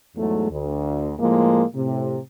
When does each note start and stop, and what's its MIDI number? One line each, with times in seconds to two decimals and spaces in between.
0.16 0.49 40
0.16 0.49 44
0.16 0.49 54
0.16 0.49 57
0.50 1.12 38
1.19 1.63 45
1.19 1.63 53
1.19 1.63 56
1.19 1.63 58
1.75 2.18 45
1.75 2.18 48